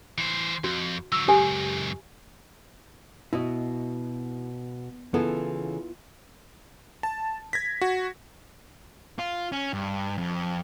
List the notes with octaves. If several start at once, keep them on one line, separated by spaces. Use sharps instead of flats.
E3 C5
F2 F#4
D3 F#3 E6
C#2 F#2 G4 A4 G#5
B2 E4 F#4 D#5
C#3 E3 B3 E4 F4 A4
A5
G#6 A#6 B6
F#4
F4
C#4
G2
F2